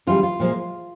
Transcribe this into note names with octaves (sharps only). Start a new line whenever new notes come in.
C#3 E3 G3 F4
F4
A#2 F3 G#3